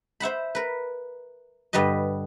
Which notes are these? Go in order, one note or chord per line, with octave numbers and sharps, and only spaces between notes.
C5 E5 F#5 B5
A#4 B4
G2 D3 G3 B4 D#5